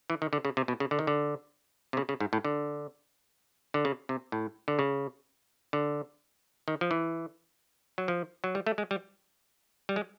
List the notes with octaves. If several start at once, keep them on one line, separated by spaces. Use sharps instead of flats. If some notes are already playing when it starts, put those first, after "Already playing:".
E3
D#3
D3
C#3
C3
B2
C#3
D3
D#3
D3
C3
C#3
C#3
G#2
A2
D3
D3
C#3
C3
A2
D3
C#3
D3
D#3
F3
E3
F#3
F3
F#3
G3
A3
G#3
G3
G3
G#3